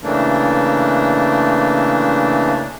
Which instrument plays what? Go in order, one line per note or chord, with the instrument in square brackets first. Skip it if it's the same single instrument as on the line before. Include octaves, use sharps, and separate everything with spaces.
[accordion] C#3 E3 A3 A#3 D4